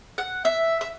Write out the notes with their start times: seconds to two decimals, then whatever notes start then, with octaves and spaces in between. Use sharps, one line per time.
0.18 F#5
0.45 E5
0.81 E5